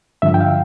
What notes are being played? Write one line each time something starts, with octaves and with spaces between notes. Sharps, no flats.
G2 D3 F3 E5
G5
F5